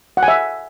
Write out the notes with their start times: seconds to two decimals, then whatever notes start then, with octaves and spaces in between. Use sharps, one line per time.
0.17 F#5
0.23 G#5
0.28 E5